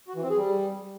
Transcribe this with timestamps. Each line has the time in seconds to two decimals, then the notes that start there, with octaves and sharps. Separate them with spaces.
0.08 F#4
0.15 E3
0.23 C4
0.30 G#4
0.37 G3